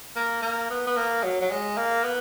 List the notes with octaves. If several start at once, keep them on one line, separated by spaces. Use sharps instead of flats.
A#3
A#3
B3
B3
A#3
F#3
F#3
G#3
A#3
B3